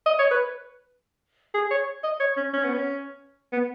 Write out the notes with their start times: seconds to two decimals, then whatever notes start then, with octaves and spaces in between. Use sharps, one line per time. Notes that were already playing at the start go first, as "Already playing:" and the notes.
0.06 D#5
0.19 C#5
0.31 B4
1.54 G#4
1.71 C#5
2.04 D#5
2.20 C#5
2.37 C#4
2.53 C#4
2.64 B3
2.74 C#4
3.52 B3